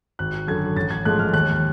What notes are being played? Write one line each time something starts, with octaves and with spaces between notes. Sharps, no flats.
G#1 F#6
F#2 D3 F#3 G#6
A1 A6
G#6
G#2 F3 A3 F#6
F6
D#2 F#6